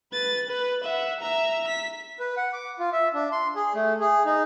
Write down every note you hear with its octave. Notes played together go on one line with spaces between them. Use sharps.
B4 A6
B4
E5 F#5
E5 A#5
B6
B4
F#5
D6
F4
E5
D4
C6
G#4
A3
G#4
D#4